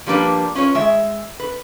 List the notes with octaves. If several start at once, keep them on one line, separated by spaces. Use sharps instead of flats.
F3 G3 A#3 D4 B4
C#4 F4 B4 C#5
G#3 E5
B4